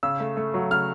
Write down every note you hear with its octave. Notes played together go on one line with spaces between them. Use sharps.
C#3 E6
A3
A3
F#3
C#3 F6